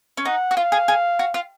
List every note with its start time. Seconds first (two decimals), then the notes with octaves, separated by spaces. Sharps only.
0.17 C#4
0.25 D#4 F#5
0.51 F#4
0.57 F4 F5
0.72 G#4
0.88 G#4
1.19 F#4
1.34 F4